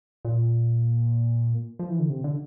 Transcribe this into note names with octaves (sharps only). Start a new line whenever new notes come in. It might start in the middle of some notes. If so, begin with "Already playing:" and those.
A#2
F3
E3
D3
C3
D3